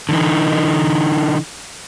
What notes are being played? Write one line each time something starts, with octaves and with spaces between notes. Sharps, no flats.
D3 E3 D#4